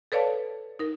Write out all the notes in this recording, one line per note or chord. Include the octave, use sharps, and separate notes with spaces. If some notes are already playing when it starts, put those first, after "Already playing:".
A4 B4 C#5 D5 F5 A5
D#4 A#4